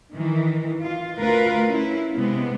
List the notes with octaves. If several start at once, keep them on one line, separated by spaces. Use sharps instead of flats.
D#3 E3
F4
D2 A3 F4 A#4 B4
C#4 E4
C3 G#3 B3